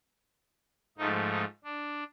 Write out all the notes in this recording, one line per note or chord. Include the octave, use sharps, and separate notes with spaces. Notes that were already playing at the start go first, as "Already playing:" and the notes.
G#2 F3 A3 D#4
D#4
D4